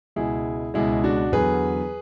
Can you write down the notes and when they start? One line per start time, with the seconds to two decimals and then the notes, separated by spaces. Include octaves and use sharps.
0.16 C#2 B2 G#3 E4 G#4
0.74 C#2 B2 G#3 E4 G#4
1.04 D4 F#4
1.32 E2 D3 F#3 G#4 B4